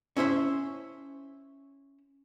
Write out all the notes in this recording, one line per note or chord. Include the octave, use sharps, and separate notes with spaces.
C#4 E4 C5 E5